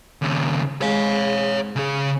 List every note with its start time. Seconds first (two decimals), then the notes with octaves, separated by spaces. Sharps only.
0.22 D#2 C#3
0.81 G#2 C3 C#5 F5
1.76 C#3 G#4